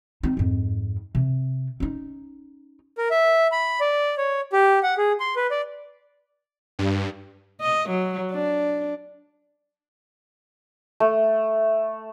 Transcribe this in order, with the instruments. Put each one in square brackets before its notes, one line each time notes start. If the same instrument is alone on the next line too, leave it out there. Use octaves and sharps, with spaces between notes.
[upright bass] C4 D#4
F2 G#2
C3
C#4 D#4
[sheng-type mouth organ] A#4
E5
B5
D5
C#5
G4
F#5
G#4
C6
B4
D5
[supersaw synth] G2
[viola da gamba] D#5
F#3
D4
[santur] A3